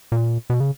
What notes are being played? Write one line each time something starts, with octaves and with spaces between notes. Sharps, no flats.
A#2
B2
C#3